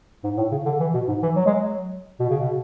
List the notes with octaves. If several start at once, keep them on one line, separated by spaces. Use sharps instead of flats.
G#2
A2
C#3
D3
E3
B2
G#2
E3
F#3
G#3
F#3
B2
C#3
B2